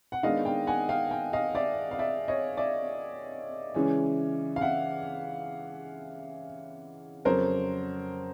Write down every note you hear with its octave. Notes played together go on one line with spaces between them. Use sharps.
F#5
D#3 G#3 B3 D4 D#5 F5
F5 G5
F#5 G#5
F5 G5
F5 G5
D#5 F5
D5 E5
F5
D5 E5
C#5 D#5
D5 E5
C#3 E3 G#3 C#4
F5
E5 F#5
F2 C#3 F#3 A#4 C5